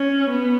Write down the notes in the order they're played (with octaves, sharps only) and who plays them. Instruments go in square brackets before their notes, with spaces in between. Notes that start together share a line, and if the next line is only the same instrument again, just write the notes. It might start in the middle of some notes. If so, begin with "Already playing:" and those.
Already playing: [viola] C#4
B3